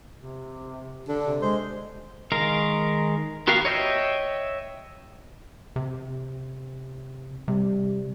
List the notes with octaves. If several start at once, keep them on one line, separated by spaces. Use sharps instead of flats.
C3
D3 D4
C3
G#3 C5
D#3 G#3 A#4 F5
B3 F#4 G4 A#4 F5
C#5 D#5 E5 G5
C3
C3 G3